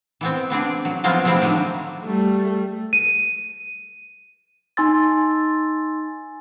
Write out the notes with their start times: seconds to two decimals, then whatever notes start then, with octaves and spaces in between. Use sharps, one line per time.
0.21 E3 B3 C4
0.50 B3 C4 D4 G#4
0.85 F#3
1.04 F3 F#3 G#3 B3 C4 F4
1.25 F3 G#3 A3 C4 E4
1.42 D#3 F#3 G3 D4
2.04 G3 A3
2.93 D#7
4.77 D#4 G#5 C6 E6 A6